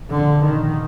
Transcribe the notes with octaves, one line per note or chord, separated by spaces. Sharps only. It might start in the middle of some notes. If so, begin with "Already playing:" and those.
A#1 D3
D#3